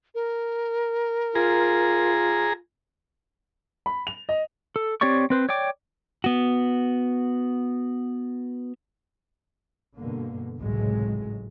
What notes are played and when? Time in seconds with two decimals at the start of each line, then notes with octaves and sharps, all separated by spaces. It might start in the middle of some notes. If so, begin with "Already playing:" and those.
0.15 A#4
1.35 F4 G#4 A#5
3.86 B5
4.07 F7
4.29 D#5
4.76 A4
5.01 C4 G4 C#5 D5 C#6
5.30 C4 B4 C5
5.49 C#5 D5 G5 D6
6.24 B3 F#4
9.96 G2 B2 D3 A#3
10.57 G#1 C#2 A2 C3 F#3 G#3